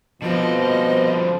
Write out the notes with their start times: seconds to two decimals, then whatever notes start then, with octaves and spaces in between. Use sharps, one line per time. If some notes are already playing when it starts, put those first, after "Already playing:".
0.22 B2 D3 F3 G3 C4 D#5